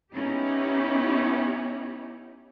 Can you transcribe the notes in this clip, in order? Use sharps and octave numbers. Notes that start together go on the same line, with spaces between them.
B3 C#4 D#4 E4 G4